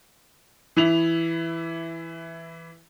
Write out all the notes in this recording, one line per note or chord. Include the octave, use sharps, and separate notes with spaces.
E3 E4 F7